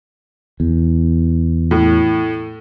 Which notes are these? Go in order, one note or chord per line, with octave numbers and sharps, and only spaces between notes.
E2
A2